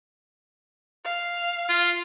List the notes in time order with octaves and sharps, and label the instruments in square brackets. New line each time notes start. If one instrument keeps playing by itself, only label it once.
[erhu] F5
[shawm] F4